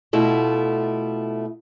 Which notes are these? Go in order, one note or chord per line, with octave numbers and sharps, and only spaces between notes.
B2 A3 E4 F4